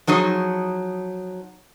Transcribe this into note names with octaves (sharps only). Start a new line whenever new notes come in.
F3 F#3 D#4 G#4